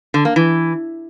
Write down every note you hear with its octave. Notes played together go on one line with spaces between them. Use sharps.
D3
A#3
E3